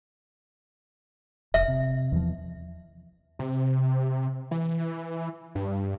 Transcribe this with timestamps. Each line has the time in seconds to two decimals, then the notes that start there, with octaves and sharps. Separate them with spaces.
1.54 F1 E5
1.68 C3
2.12 E2 F3
3.39 C3
4.51 E3
5.55 G2